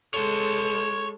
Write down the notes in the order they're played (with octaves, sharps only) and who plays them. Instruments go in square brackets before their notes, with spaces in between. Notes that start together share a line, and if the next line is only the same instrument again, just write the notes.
[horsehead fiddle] G#3 A4 [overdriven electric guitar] C#5 C6